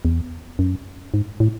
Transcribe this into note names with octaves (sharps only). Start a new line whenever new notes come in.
E2
F#2
G#2
A2